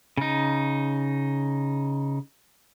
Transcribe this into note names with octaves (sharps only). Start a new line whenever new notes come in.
C#3 D#4